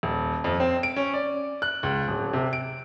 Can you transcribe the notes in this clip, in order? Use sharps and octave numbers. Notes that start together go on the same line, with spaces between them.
D#1
F2
C4
D7
C#4
D5
F#6
C#2
D1
C3
D7